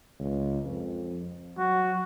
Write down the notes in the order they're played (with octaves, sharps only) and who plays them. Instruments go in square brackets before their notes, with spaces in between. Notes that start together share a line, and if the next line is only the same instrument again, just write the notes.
[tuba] C#2
F2
[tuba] F#3 [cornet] F#4